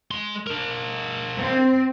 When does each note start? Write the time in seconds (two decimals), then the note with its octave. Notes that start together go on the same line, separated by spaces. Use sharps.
0.11 G#3 C6
0.47 D4 A#4
1.38 C4